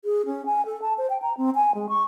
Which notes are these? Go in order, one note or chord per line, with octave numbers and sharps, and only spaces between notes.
G#4
C#4
G#5
A4
A5
C5
G5
A#5
C4
G#5
G#3
C#6